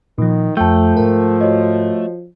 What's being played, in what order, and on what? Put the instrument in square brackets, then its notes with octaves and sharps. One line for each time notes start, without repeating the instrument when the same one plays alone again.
[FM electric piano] A#2 F3 [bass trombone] D#3
[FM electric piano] F2 G6 [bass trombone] F3 [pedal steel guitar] A3 [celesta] G5 A5
[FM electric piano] G#2 A#4
[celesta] F#4 C#5 D#5